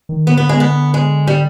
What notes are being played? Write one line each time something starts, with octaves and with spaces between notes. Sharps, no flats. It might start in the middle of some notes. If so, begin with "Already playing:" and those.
D#3
D3 B3
B3
G#3
B3
G#3
G3